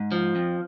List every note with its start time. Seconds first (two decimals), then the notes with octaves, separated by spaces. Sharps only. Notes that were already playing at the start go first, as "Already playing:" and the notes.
Already playing: G#2
0.12 F3
0.36 F2